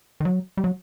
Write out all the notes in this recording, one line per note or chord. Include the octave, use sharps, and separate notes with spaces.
D#3
F#3
G3
F#3